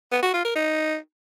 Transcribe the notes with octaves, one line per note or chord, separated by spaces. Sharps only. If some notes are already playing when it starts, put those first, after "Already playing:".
B3
F#4
F4
A#4
D#4